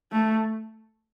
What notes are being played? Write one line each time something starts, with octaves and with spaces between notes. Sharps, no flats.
A3